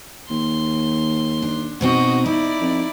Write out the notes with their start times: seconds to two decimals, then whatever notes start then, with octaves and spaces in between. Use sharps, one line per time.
0.30 D#2 C6
1.42 D4
1.81 B2 C4 D#4 F#4 D#5
2.26 D#4 E4 D5
2.61 F2